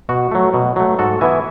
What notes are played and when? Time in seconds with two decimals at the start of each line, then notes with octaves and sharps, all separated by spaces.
0.09 B2 F#4
0.31 F#3 A3
0.54 B2
0.76 F#3 A3
0.99 G#2 F#4 A4
1.21 E3 B3 E4 E5 G#5